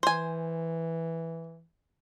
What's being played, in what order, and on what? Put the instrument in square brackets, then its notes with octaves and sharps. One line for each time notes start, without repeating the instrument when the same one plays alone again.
[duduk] E3 [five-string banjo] C5 G#5